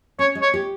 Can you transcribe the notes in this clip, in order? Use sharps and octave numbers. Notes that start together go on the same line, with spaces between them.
C#4 C#5
G#3
C#5
G4